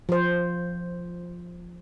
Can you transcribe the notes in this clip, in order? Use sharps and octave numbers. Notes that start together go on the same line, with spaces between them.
F3 C5